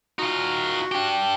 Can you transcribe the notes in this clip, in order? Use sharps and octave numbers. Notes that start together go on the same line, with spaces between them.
D#4 F4 F#4
D4 G4